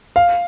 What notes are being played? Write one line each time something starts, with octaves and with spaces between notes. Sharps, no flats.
F5